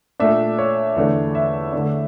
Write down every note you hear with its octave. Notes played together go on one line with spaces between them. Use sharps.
A#2 A3 D4 E5
C#5
E2 D3 A3 D4
E5
D3 A3 D4